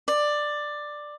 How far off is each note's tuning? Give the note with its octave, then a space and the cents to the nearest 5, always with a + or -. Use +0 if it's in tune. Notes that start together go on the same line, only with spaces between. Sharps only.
D5 +10